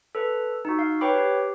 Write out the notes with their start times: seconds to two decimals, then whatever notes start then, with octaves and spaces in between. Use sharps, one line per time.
0.15 A4 B4
0.65 D#4 F#4
0.79 F5
1.01 B4 C#5 G5 B5 D6
1.15 G4